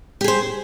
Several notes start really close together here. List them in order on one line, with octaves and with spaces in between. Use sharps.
G4 G#4 C5